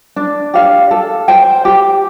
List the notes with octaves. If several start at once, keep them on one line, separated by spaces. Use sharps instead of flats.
D4
G4 F5
A4
C5 G5
G4